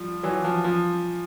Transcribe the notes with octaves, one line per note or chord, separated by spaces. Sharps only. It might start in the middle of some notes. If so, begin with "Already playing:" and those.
Already playing: F3 G3
E3 F#3
F3
F3